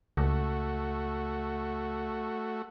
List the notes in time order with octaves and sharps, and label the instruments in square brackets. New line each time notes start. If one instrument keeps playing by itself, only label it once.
[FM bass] C#2 [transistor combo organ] A3 F#4